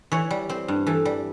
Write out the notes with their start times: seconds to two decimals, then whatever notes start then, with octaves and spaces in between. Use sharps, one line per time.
0.12 E3 C#5
0.31 G3
0.49 C4 C5
0.68 G2
0.86 E3 A4
1.05 G3